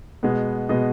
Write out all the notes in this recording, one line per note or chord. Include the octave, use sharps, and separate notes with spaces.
B2 G#3 B3
B2 G#3 B3 D#5